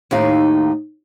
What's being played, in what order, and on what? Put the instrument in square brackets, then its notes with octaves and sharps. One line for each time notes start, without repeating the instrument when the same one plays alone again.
[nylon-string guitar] D#2 A2 D#4 E4 F5